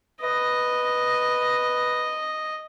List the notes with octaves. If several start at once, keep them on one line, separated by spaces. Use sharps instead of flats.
B4 D#5